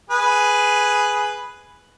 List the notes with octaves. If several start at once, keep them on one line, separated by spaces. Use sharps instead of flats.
G#4 B4